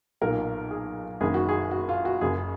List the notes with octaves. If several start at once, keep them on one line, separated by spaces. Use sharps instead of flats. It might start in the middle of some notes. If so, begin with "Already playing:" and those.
B1 A#2 A#4
G#4
F#1 F#2 D#3 G#4
F#4
G#4
F#4
F4
F#4
F#1 F#2 C#3 G#4